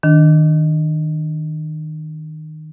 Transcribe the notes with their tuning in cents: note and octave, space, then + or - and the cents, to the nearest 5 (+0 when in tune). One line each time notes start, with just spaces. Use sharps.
D#3 +0 D4 +0